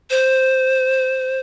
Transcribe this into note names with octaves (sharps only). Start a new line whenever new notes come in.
C5